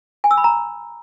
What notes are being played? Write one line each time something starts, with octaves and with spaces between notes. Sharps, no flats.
G#5
E6
B5
A#5